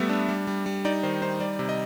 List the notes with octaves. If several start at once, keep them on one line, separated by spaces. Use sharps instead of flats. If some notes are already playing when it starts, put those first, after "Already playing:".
Already playing: G3 A3 B3 E5
D4
G3
G3
G3
D#4 D5
D#3 C5
D#4 C5
G3 D5
C3
D#5